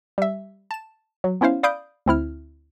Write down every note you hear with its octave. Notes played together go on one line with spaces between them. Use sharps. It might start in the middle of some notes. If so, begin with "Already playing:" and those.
G3 E5
A5 E7
F#3
B3 C#4 E4 C5 F5
D5 F5 B5 D#6 G6 D7
D2 C4 E4 F6